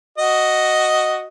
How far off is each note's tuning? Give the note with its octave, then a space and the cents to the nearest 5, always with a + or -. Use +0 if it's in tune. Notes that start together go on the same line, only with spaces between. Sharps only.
F#4 +0 D#5 +0